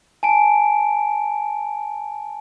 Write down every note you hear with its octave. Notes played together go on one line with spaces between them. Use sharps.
G#5 A5 D7